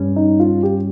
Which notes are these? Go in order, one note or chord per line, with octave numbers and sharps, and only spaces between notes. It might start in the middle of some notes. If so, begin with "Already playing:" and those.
Already playing: G2 G3 C#4
D#4
F4
G4